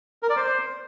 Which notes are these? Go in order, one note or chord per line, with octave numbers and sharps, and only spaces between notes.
A#4
D5
C5